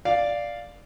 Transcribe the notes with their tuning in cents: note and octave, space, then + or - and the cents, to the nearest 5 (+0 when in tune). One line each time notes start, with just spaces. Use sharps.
D5 +0 F5 +0